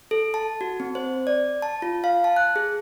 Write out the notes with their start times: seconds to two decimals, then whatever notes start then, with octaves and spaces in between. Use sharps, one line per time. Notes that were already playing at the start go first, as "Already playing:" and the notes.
0.11 A4
0.34 A5
0.61 F#4
0.80 C4
0.95 C5
1.27 D5
1.62 A5
1.82 F4
2.04 F5
2.24 A5
2.36 F#6
2.56 G#4